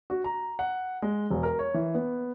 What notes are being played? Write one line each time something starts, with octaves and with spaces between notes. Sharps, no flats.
F#4
A#5
F#5
G#3
E1
A#4
C#5
E3
B3